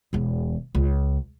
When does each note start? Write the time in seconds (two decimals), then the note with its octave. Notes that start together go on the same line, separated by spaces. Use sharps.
0.13 E1 E2
0.75 C#2